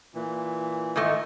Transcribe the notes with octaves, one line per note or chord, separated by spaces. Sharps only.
A#2 E3
G#2 D#3 A3